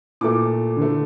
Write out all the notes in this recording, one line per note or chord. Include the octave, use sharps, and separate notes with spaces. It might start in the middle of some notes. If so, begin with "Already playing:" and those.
A#2 A3 D6
D3 A3